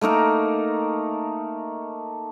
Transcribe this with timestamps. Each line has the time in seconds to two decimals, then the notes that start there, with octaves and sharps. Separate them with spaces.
0.01 A3 A#3 D#4 A#4